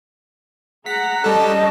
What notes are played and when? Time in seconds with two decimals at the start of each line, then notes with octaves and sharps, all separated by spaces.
0.86 G#4 F#5 A#5 B6
1.24 G3 C#4 A4 D#5 A5